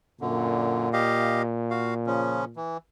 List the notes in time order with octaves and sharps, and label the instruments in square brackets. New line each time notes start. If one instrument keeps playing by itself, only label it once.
[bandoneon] F#2 D3 [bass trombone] A#2
[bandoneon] G4 D#5 F5
F#4 F5
C#3 F3 C#4
E3